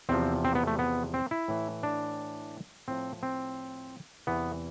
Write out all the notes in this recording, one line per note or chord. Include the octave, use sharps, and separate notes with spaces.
E2 C3 F3 C4
C4
B3
A3
B3
C4
E4
A2 E3
D4
A2 F3 C4
C4
E2 C3 E3 B3